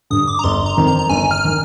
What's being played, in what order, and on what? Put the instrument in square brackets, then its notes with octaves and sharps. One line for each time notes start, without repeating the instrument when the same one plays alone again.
[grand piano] G2 D3 [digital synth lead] D#6
[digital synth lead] D6
A#5
[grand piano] G1 [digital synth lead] C6
[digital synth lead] A#5
[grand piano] F2 D#3
[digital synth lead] A#5
A#5
[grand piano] G1 [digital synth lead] G#5
[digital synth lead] F6
[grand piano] D#3 [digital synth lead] F6